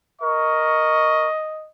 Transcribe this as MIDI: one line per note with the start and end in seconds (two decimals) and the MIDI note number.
0.22 1.28 70
0.22 1.69 75
0.22 1.28 85